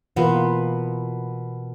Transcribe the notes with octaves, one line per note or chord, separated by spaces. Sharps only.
B2 E3 A#3 B3 F4 B4